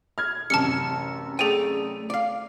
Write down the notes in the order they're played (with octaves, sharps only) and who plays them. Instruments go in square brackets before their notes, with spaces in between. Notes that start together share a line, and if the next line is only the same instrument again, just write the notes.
[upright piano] F6 G#6
[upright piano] A1 F#2 C3 [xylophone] A5 F6 C#7
[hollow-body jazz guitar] A3 D5 G5 [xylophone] G#4 D#7
[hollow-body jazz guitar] D5 F5